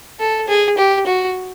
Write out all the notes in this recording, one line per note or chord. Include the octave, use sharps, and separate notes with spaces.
A4
G#4
G4
F#4